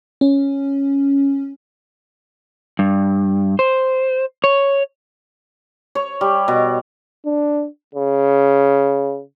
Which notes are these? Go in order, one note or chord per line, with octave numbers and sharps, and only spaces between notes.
C#4
G2
C5
C#5
C#5
G3
B2
D4
C#3